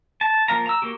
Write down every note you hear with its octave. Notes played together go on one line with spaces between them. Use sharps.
A5
F3 A#3 F5 A#5
A#5 E6
A#3 F#4 G4